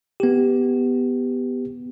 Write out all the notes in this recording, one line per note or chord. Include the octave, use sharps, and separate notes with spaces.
B3 G4